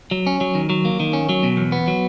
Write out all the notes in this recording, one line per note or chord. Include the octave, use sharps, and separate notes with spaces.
F#3
C#4
F#3
D#3
F#3
A#3
D#3
C#4
F#3
B2
E2
B3
F#3